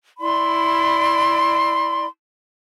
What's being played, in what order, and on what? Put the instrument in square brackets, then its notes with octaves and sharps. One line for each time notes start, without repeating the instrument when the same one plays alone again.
[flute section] E4 D5 B5 C6